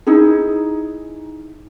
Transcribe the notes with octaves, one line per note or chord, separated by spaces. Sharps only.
D#4 E4 G#4